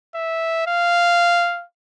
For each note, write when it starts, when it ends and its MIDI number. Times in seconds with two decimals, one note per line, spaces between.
0.15 0.67 76
0.67 1.64 77